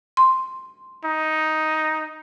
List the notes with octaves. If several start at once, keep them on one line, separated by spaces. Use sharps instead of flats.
C6
D#4